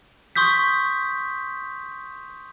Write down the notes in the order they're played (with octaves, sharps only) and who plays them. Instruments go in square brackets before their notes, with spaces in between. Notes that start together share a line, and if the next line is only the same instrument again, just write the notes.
[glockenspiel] C6 C#6 D#6 G6 B6